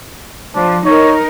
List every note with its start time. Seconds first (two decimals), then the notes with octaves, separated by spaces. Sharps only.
0.55 F3 D4
0.85 D#4 A#4 C#5